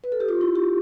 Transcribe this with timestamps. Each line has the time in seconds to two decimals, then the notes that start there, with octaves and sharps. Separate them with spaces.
0.04 B4
0.12 A4
0.20 G4
0.29 F4
0.41 E4
0.56 G4